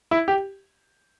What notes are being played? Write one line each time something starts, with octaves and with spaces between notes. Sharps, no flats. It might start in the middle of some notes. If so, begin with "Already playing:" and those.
E4
G4